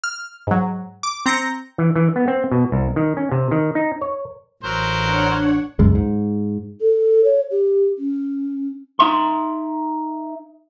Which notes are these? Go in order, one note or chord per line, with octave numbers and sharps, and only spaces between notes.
F6
G#2 F#3
D6
C4 A#5 G6 A#6 C#7
E3
E3
B3
C4
B2
C2
D#3
C#4
C3
D#3
D#4
C#5
A1 F#3 A#4 C5
D4 C#5 F#5
G1 C#2 F#2 G#3
G#2
A4
C#5
G4
C#4
D#4 E5 C6